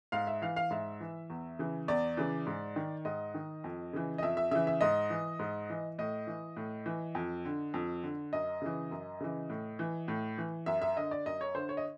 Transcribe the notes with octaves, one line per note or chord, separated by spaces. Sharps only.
G#2 F5
E5
E3 F5
F5
G#2 E5
E3
E2
C#3 E3
E2 D5
C#3 E3
G#2
D#3
G#2 D#5
D#3
F2
C#3 E3
D#5
F2 E5
E5
C#3 E3 E5
E5
G#2 D#5
E3
G#2
E3
A2 D#5
E3
A2
E3
F2
D3
F2
D3
F#2 D#5
C#3 E3
F#2
C#3 E3
A2
E3
A2
E3
F#2 E5
E5
D3 D#5
D5
F#2 D#5
C#5
D3 C5
C#5
D#5